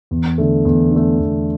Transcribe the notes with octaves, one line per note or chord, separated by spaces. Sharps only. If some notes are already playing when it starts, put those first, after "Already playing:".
E2
D3 A3
E2
D3 A3
E2